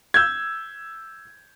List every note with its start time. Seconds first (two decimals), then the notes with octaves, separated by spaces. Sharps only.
0.14 E6 G6 G#6